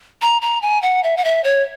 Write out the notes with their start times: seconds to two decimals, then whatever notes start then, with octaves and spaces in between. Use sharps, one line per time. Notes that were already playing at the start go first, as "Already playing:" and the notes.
0.22 A#5
0.42 A#5
0.62 G#5
0.82 F#5
1.04 E5
1.17 F#5
1.25 E5
1.44 C#5